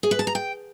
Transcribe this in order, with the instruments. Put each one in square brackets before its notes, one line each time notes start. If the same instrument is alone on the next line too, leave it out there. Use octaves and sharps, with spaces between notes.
[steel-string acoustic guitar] G#4
B4
A5
A#5
G5